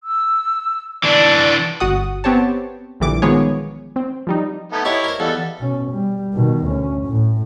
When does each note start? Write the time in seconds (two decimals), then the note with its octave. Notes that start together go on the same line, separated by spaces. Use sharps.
0.04 E6
1.03 E3 D4 D5
1.80 G1 F#4 F#5 D#6
2.24 B3 C4 G4 C#5 A5
3.00 A#1 D3 E3 G3 D6
3.22 D#3 F3 G#3 B3 G#4 C#5
3.96 C4
4.27 F3 G3 D#4
4.72 A3 B3 D#4 A5 G#6
4.85 E4 G4 C#5 D#5 E5
5.04 A#4 C5
5.20 E2 G3 G4 A4 D#5 F5
5.59 B2 C#4
5.91 G3
6.34 B2 D#3
6.66 D2 C#4
7.06 A2